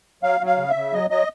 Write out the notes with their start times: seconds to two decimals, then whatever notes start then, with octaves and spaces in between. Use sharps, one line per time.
0.23 F#3 F5
0.41 F#3
0.46 F5
0.58 C#3
0.70 E5
0.75 C#3
0.93 F#3 D#5
1.10 F#3 D#5